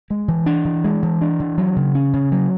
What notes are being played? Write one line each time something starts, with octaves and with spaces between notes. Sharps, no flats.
G#3
E3
D4
E3
G#3
E3
D4
E3
F#3
C#3
C#4
C#3
F#3